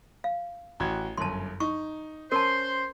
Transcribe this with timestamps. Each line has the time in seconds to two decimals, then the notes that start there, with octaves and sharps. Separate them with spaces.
0.24 F5
0.80 A1 F#4 G#6
1.18 G1 F#2 A5 C6
1.60 D#4 C#6
2.32 C#4 A#4 C5 A5 C6